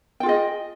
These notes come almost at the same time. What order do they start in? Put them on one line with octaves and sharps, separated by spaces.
G5 F4 G#4 D#5